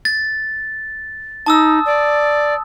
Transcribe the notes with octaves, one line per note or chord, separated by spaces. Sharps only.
A6
D#4 A5 D#6 E6
D5